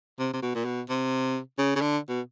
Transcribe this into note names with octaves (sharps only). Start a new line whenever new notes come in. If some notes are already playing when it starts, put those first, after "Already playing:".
C3
C3
B2
A#2
B2
C3
C#3
C#3
D3
B2